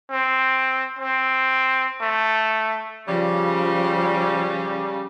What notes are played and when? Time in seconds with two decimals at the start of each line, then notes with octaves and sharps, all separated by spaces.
0.11 C4
0.99 C4
2.01 A3
3.08 C#3 F3 G3